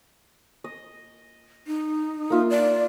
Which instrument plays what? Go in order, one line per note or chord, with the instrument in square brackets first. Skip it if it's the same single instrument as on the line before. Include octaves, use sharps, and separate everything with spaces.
[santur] D#5
[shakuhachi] D#4
[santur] A#3 F4 E5
[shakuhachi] D5